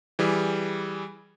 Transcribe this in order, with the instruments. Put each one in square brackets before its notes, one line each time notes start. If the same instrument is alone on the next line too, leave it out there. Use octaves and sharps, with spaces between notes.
[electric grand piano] E3 G3 G#4